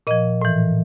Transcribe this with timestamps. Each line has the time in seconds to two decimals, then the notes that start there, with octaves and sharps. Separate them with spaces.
0.07 A#2 F3 D#5
0.41 A2 E3